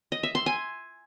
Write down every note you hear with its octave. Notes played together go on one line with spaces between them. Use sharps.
D#5
E5
C6
G#5